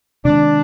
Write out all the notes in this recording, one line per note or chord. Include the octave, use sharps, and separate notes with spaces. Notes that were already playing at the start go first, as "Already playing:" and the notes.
C3 D#3 G#3 D4